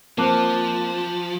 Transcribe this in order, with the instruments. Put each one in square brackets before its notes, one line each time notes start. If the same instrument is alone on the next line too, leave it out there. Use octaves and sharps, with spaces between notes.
[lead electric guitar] F3 [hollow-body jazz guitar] A#3 [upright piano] C4 [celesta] A5 D6 F#6